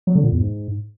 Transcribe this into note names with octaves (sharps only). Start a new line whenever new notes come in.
F#3
D3
A#2
E2
G#2